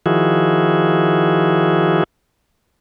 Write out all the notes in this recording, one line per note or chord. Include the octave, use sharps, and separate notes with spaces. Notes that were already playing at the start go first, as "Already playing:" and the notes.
D#3 F3 E4 F#4 G#4